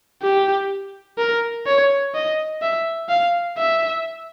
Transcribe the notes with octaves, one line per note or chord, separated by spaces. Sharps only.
G4
A#4
C#5
D#5
E5
F5
E5